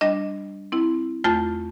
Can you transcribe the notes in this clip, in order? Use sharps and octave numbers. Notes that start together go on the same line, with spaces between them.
G3 D4 D#5
C4 E4
E2 A3 F4 A5 A6